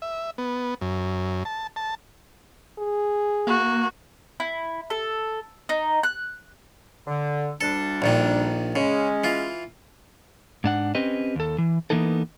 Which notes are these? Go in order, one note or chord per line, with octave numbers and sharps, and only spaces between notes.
E5
B3
F#2
A5
A5
G#4
A#3 F#4
E4
A4
D#4
F#6
D3
D2 G3 D4 A4
A#1 A#2 D#3
C#3 G#3 C#4
E3 F4
G#2 D4 F#5
C4 C#4 G4 B4 D#5
D#2 A4
E3
E3 A#3 B3 D#4 A4